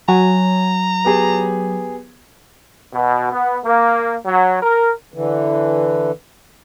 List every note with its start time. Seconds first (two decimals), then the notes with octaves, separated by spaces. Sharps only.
0.08 F#3 G#5 A#5
1.05 B3 G4 G#4
2.93 B2
3.33 B3
3.65 A#3
4.25 F#3
4.62 A#4
5.14 D3 E3